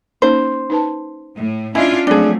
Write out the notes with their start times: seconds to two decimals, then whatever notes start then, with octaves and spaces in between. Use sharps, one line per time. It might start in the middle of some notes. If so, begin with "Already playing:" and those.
0.22 A#3 C#4 D#4 C5
0.70 D#4 B4 A5
1.35 A2
1.75 C#4 D4 E4 F4 D#5 E5 G#5
2.07 F3 F#3 G#3 A3 C4 D4 G#4 A5